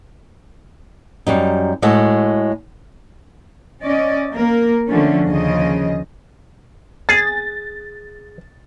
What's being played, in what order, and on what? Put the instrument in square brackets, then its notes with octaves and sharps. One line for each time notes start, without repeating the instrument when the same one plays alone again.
[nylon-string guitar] F#2 G3 D#4
A2 G#3 F#4 G#4 A4
[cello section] C#4 D5 D#5
A#3 A#4
D3 F3 A3 C#4
D#2 C#3 F3 D#5
[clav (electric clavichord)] G#4 [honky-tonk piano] A6